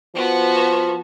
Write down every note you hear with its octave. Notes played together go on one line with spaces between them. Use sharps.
F3 B3 F#4